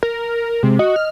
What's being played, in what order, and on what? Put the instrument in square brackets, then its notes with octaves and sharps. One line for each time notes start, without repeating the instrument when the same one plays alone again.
[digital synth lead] A#4
[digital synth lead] C3 [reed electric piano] G#3
[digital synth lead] F#4 [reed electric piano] D#5
[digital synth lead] F6